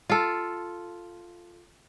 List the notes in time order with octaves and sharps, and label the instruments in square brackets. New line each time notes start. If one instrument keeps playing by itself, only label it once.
[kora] F4 A4